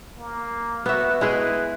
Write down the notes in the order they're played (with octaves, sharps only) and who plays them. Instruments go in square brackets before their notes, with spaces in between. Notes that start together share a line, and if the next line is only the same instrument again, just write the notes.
[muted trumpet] A#3
[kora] B3 E5 [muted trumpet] F#4
[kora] G#3 E4 G#4 [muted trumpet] B4